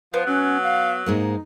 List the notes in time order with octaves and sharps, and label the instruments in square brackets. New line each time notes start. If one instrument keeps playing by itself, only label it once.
[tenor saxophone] F3 [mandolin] B3 [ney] C5
[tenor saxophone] F#3 [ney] C#4
[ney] F5
[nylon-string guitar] G#2 G#3 A#3 [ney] D#4